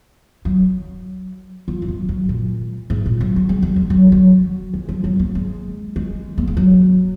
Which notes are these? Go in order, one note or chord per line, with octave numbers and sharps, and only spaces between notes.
F#3
F3
F2
F#2
F#2
A#2
G#2
A#2
F#3
F#3
G#3
F#3
G#3
F#3
F#3
G#3
F3
F#3
A#3
G#3
G#3
A#3
G#3
F#3